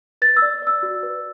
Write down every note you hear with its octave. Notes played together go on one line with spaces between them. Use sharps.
B4 A6
E6
D5
D5 E6
F#4
B4